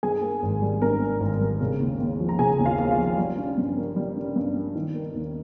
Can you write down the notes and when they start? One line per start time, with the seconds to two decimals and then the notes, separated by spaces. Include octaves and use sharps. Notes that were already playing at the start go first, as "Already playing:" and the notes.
0.03 G2 G#4 G#5
0.22 A#3
0.43 G#1
0.62 G3
0.82 G2 A#4 A#5
1.01 A#3
1.20 G#1
1.40 G3
1.61 C#3
1.80 D#2
2.00 D#2
2.20 F3
2.29 A#5
2.39 C#3 G#4 G#5
2.59 D#2
2.65 F4 F5
2.78 D#2
2.91 F4 F5
2.99 F3
3.17 G3
3.38 C#4
3.58 G2
3.77 A#3
3.96 G3
4.16 C#4
4.36 G2
4.55 A#3
4.75 D#3
4.94 A#3
5.14 D#2